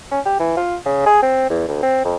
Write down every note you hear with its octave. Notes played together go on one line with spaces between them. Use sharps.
C#4
G4
E3
F4
C#3
G#4
C4
E2
D2
C4
F2